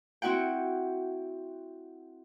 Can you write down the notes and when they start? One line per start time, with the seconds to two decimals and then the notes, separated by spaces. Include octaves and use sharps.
0.22 C4 E4 F#4 F#5 G5